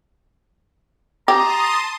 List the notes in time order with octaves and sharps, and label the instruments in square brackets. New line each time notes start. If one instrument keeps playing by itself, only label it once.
[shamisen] G4 [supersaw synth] A5 C6 D#6 [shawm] A#5